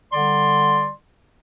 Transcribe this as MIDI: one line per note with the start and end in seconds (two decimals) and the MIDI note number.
0.13 0.90 50
0.13 0.90 55
0.13 0.90 74
0.13 0.90 84